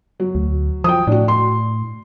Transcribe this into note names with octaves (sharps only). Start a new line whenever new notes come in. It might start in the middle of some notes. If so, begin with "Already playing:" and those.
F#3
D2
F3 G5 D#6
A2 D4 F#4
C6